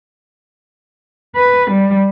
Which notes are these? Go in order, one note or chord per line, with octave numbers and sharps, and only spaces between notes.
B4
G3